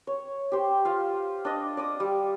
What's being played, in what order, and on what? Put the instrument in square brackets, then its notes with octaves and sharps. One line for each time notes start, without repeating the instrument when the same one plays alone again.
[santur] C#5
G4 C5
F4 F5
D4 D5 D#5
D5 D6 D#6
G3